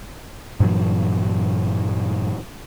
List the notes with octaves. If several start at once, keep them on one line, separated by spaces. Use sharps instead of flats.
G2 A#2 E3 F#3